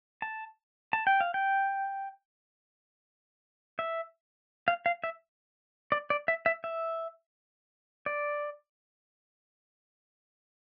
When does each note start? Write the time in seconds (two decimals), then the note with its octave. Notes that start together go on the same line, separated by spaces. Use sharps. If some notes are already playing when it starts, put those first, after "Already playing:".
0.22 A5
0.93 A5
1.07 G5
1.21 F5
1.34 G5
3.79 E5
4.68 F5
4.86 F5
5.04 E5
5.92 D5
6.10 D5
6.28 E5
6.46 E5
6.64 E5
8.06 D5